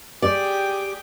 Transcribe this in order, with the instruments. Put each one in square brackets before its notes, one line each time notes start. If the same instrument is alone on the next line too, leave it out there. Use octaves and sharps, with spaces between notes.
[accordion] G4 D6 [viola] G#4 G5 [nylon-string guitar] D5